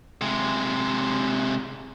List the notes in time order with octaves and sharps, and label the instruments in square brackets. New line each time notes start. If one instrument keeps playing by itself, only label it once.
[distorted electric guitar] C3 G#3